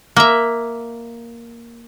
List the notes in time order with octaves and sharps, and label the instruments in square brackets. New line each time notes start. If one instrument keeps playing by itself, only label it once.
[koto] A#3 E5